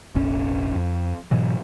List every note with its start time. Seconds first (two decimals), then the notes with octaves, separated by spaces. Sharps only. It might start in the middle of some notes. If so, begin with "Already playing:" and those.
0.15 F1 A#1 C#4
0.75 F2
1.31 G#2 B2 E3 F#3